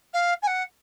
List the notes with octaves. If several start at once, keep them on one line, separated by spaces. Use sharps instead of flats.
F5
G#5
F#5